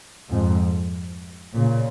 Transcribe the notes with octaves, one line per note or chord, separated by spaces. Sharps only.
F2 G#2
A#2 C#3